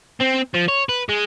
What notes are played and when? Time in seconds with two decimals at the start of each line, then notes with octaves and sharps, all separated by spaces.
0.21 C4
0.55 F3
0.68 C#5
0.89 B4
1.09 G#3